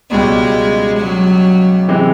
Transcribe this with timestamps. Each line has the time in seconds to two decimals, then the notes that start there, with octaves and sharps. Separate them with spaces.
0.11 C#2 B2 G3 G#3
0.99 F#3
1.88 C3 E3 G#3